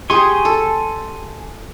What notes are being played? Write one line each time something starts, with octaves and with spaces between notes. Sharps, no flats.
G4 G#4 G#5 C6 C#6
A4